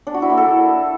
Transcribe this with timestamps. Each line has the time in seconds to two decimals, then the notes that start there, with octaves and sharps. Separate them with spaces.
0.07 D4
0.14 F#4
0.22 E4
0.30 A#3
0.37 A4